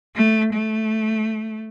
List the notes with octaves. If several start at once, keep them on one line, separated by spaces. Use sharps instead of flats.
A3
A3